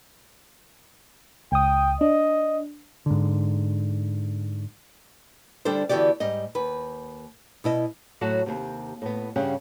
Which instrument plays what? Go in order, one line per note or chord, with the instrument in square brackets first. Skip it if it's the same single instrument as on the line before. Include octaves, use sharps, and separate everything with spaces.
[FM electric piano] C#2 D#6 [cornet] G5
[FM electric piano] D4 [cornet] D#5
[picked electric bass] G#2 D3
[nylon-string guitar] D3 G3 D4 A4 C5
D3 E3 B3 F#4 G4 D5
G#2 G3 D#5
D#2 B4
B2 E4 D#5
A2 F#3 F#4 C#5 F#5 A5
D#2 C3
A2 B3
G2 C#3 C#4 G4 F#5